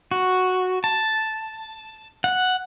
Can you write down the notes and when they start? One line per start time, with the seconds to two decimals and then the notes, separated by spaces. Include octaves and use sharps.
0.11 F#4
0.84 A5
2.24 F#5